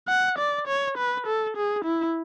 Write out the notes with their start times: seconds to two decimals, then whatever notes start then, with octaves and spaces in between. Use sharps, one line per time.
0.08 F#5
0.38 D5
0.67 C#5
0.97 B4
1.27 A4
1.56 G#4
1.85 E4